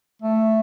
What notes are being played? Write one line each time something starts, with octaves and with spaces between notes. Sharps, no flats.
A3